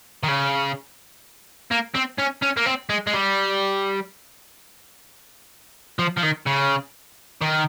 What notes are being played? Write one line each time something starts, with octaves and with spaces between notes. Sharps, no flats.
D#3
C#3
A#3
C4
C#4
C#4
A#3
C4
G#3
G#3
G3
F3
F3
D#3
C#3
D#3